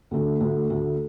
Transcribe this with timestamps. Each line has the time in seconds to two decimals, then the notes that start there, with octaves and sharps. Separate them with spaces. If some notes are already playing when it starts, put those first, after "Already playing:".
0.11 D2 D3 A3
0.40 D2 D3 A3
0.70 D2 D3 A3